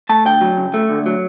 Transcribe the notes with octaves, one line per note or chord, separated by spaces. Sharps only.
A3 A5
D2 G5
F#3
C#3
A3
D2
F#3